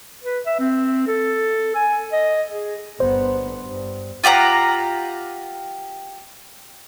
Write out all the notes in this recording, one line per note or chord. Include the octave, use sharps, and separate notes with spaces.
B4
E5
C4
A4
G#5
D#5
G#4
G1 B3 C5
G2
F4 G4 F#5 A#5